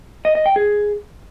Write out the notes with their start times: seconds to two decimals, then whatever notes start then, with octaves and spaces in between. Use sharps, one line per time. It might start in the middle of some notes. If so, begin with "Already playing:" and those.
0.25 D#5
0.35 D#5
0.46 G5
0.56 G#4